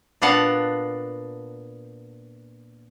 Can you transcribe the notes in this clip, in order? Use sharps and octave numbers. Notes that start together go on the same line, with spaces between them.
A#2 B3 D4 F5 F#5 A5